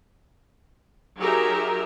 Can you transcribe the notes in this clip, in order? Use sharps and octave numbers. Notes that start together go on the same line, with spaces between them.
F#3 D#4 G4 G#4 A#4 E5